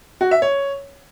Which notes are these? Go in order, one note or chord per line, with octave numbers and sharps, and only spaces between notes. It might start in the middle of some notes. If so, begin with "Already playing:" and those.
F#4
E5
C#5